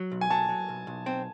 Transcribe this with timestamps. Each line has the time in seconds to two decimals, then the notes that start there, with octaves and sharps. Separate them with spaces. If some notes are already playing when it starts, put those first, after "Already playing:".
Already playing: F#3
0.12 B1
0.21 G#5
0.30 F#3 A5
0.49 F#3
0.69 B1
0.87 B1
1.06 C4